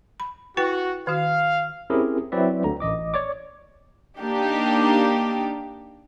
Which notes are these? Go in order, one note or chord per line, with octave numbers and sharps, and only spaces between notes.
B5
E4 F#4 B4 G5
D#3 F#4 F5
C4 C#4 E4 G4 G#4 A#4
F#3 C4 E4 B4 D5 E5
D2 D3 A#5
A1 D#5 D6
C#5 D5 D6
A#3 D4 D#4 G4